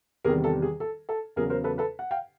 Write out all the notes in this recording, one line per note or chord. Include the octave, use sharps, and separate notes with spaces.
E2 C3 D#3 G3 G#4 A#4
A4
G#4
A4
A4
E2 C#3 F#3 G#4 A#4
A#4 C5
A4 B4
A4 B4
F#5
F5 G5